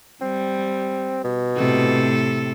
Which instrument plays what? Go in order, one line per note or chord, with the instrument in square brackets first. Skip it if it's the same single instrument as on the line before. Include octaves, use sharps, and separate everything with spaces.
[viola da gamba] G3 [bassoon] C4
[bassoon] B2
[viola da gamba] A2 C3 A4